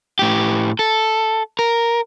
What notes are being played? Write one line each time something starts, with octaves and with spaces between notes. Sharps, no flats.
A2 G4
A4
A#4